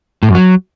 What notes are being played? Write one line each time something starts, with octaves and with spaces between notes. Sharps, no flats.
A2
F#2
F#3